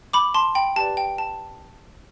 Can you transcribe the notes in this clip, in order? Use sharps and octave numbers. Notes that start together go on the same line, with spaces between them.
B5 D6
A5 C6
G5 B5
G4 B4 D5 A5
G5
A5